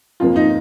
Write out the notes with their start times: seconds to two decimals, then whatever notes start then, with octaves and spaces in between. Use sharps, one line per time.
0.20 F2 C3 F3 A#3 F4
0.36 D#4